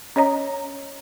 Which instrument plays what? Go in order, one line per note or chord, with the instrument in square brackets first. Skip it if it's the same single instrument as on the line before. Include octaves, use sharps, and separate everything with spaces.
[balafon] C#4 C#5 D#5 A#5